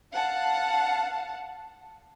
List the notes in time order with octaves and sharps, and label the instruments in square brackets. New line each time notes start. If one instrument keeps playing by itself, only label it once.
[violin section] F5 F#5 A5